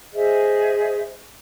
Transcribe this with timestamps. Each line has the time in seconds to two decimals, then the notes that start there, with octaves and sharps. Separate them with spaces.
0.13 G#4 C5 D#5 E5